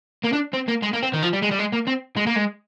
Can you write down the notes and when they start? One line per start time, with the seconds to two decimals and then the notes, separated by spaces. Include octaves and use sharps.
0.24 A#3
0.32 D4
0.53 C4
0.68 A#3
0.82 G#3
0.93 A#3
1.03 C4
1.13 D#3
1.22 F3
1.33 G3
1.42 G#3
1.51 G3
1.59 G#3
1.72 A#3
1.87 C4
2.17 G#3
2.27 A#3
2.36 G#3